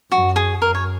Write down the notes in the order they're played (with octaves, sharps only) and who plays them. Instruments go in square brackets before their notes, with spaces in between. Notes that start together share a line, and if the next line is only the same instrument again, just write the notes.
[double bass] F#2 [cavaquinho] F#4
[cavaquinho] G#4
[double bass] F#2 [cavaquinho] A#4
[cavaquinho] C#5